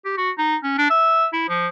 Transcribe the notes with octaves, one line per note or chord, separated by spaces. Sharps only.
G4
F#4
D#4
C#4
D4
E5
E4
F3